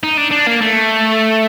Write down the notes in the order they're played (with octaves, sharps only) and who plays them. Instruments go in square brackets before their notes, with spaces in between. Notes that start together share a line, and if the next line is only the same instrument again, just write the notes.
[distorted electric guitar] D#4
D4
D4
A#3
A3